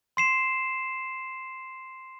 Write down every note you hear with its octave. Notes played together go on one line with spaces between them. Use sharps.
C6 C7 E7